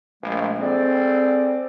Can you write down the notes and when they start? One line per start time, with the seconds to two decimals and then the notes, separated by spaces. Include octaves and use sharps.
0.23 A#1 G#3 A3
0.60 C4 G#4 A4 D5